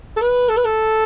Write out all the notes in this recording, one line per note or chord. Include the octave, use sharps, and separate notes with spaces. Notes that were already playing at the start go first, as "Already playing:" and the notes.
A4
B4
A4
B4
A4